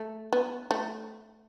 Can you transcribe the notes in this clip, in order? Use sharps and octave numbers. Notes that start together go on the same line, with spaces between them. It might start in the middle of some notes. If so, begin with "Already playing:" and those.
Already playing: A3
B3
A3